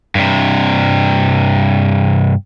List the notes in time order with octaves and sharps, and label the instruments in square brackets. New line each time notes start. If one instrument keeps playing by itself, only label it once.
[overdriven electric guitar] G2 C3